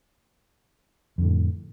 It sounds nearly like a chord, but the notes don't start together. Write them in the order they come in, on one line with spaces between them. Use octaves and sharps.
F2 D3 A2